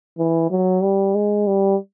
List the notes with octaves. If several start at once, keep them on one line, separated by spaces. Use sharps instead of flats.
E3
F#3
G3
G#3
G3